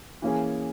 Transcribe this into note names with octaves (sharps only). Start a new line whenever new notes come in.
E3 A#3 C#4 G#4